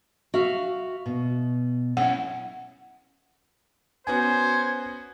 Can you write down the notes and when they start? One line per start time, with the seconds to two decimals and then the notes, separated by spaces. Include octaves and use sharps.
0.34 F#4 E5 F5
1.06 B2
1.97 C#4 E4 F#5
4.07 B3 C#4 F#4 C5 G#5 G#6